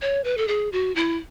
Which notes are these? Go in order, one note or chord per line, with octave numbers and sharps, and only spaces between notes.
C#5
B4
A4
G#4
F#4
E4